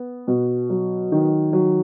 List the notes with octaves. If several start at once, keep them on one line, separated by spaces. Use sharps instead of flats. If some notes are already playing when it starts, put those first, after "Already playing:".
Already playing: B3
B2
F#3
D#3
F#3